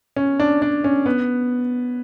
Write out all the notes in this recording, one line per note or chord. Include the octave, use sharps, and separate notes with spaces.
C#4
D4
D4
C#4
B3